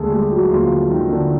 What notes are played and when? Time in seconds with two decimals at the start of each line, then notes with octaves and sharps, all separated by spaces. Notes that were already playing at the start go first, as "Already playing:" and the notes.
Already playing: D#2 D3 G#3 A3 G#4 A4
0.12 G3 G4
0.31 F#3 F#4
0.51 D#2 D3 F3 F4
0.90 D#3 D#4
1.09 D3 D4